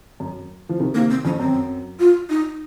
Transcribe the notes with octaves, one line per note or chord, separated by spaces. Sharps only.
F#2
F3
C3 D#3
C3 D#3 A#3
C4
F2 C#4
F#2 C4
F4
D#4